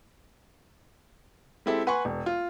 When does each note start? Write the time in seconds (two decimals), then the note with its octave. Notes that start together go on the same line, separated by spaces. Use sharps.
1.66 G#3 C4 E4 G4 A4
1.87 B4 F#5 G#5 C6 C#6
2.05 E1
2.26 F4